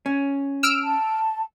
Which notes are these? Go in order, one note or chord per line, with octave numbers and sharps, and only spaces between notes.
C#4
E6 F6 D7
A5